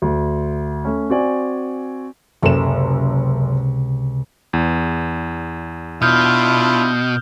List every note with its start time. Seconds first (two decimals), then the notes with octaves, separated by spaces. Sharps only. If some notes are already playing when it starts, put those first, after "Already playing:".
0.02 D2
0.85 A3 C#4
1.10 C4 F#4 D5 G#5
2.42 F#1 C#2 C3 A4 E7
4.53 E2
6.02 B2 D4 E4 F4 D#6 F6 G6